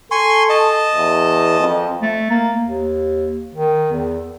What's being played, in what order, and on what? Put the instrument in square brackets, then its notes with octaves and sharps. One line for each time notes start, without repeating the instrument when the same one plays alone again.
[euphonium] A4 [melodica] G#5 C6 C#6
[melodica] D#5 A5
[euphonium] E2
F2
[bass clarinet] A3
A#3
D#2
D#3
E2